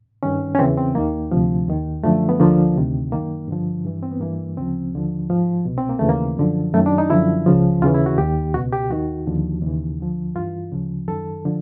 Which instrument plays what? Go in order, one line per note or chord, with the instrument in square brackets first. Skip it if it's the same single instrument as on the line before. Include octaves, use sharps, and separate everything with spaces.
[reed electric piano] G2 D#3 C#4
C#4
E2 C#3 E3 C4
C4
D#2 D#3 A#3
D2 C3 F3
D#2 D#3
F#2 D3 F3 A3
B3
D2 D3 F3 A#3
D2 C3 D#3
F#2 D#3 A#3
G2 D3 F3
G2 E3
C4
B3
G2 E3 A#3
D2 C#3 F3 C4
D#2 D3 F3
G#2 F3
C2 B2
C4
A#3
D#2 C#3 E3 A3
A#3
F#2 D3 F3
F#2 A3
D#3
D4
D#4
F#2 D3 F3 E4
C#2 C#3 F3
D#2 C#3 E3 F4
E4
F#4
D#2 D#3 G4
C#2 B2 F#4
G4
D#2 D#3 F#4
D#2 D3 F3
D#2 C#3 E3
D2 D3 F3
G2 E3 F4
D2 C#3 F3
F#2 D#3 A4
D3 F3